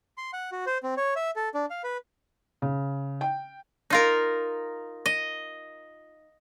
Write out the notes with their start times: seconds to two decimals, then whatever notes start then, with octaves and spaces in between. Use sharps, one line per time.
0.17 C6
0.33 F#5
0.52 F#4
0.66 C5
0.83 C4
0.97 C#5
1.16 E5
1.36 A4
1.54 D4
1.70 F5
1.84 B4
2.62 C#3
3.21 G5
3.90 D#4 F4 A#4
5.06 D#5